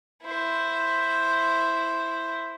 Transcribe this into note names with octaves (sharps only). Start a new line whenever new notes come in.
E4 C5